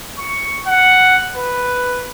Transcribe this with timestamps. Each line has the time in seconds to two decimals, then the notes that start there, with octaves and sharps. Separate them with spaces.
0.19 C#6
0.67 F#5
1.36 B4